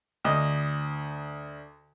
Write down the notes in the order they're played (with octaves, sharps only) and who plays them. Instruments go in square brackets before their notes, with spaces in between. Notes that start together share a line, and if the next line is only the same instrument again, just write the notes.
[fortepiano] D2 D#5